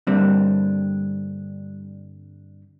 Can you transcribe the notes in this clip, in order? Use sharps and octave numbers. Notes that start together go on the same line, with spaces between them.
G2 D3 G3 A#3 C4 D4